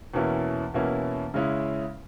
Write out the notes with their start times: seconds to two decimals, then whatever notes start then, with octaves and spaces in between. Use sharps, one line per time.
0.14 E2 B2 A#3 C#4 E4
0.74 E2 B2 A#3 C#4 E4
1.34 C#3 G#3 C#4 E4